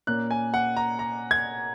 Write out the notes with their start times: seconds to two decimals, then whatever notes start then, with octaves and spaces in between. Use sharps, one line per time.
0.07 A#2 A#3 C#4 F#6
0.31 G#5
0.54 F#5
0.77 A#5
0.99 A#5
1.31 G#6